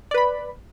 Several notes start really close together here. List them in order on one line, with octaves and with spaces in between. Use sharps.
D5 B4 B5